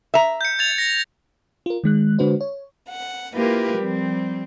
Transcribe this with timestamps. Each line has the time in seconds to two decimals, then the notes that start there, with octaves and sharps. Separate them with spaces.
0.14 E5 A#5
0.41 G6 C#7
0.59 G#6 A6 F7
0.78 A#6
1.66 F4 A#4
1.84 D#3 G#3 F#6
2.19 D3 G#3 D4 F#4 B4 C5
2.41 C#5
2.88 F#5
3.34 A#3 E4 F4 G4 A#4 B4
3.78 F3 G3 C4